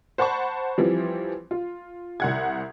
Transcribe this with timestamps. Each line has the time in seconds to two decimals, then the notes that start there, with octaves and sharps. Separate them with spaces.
0.18 C5 F#5 A5 B5 C#6
0.78 E3 F3 G3 C4
1.51 F4
2.20 C2 F#5 G#6